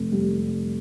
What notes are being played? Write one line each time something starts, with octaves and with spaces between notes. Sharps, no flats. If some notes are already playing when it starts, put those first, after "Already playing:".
Already playing: F1
G3